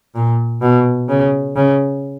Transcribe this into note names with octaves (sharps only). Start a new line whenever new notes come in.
A#2
B2
C#3
C#3